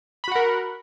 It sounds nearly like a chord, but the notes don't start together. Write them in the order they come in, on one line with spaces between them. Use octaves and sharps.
B5 F#4 F#5 A#4